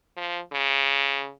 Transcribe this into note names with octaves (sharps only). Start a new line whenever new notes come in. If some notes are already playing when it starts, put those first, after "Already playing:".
F3
C#3